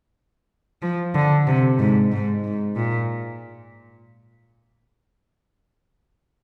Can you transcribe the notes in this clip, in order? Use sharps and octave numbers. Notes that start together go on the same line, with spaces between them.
F3
D3
C3
G#2
G#2
G#2
A#2